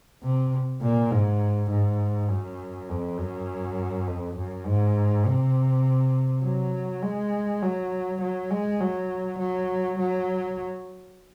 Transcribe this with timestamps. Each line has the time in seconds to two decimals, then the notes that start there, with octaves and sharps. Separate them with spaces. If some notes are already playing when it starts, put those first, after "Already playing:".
0.23 C3
0.82 A#2
1.11 G#2
1.71 G#2
2.30 F#2
2.89 F2
3.18 F#2
4.07 F2
4.37 F#2
4.66 G#2
5.26 C3
6.44 F#3
7.03 G#3
7.62 F#3
8.22 F#3
8.50 G#3
8.80 F#3
9.39 F#3
9.99 F#3